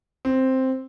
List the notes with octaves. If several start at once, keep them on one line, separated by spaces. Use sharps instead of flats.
C4